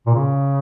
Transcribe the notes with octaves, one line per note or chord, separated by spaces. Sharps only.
A#2
C#3